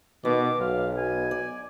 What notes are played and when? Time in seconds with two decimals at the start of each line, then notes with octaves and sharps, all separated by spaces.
0.25 B2 D#3 B3 D6
0.60 B1 F#3 F5
0.97 B2 G#5
1.31 D5